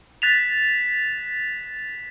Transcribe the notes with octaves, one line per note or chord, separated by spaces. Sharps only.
F#6 A6 B6 E7 F7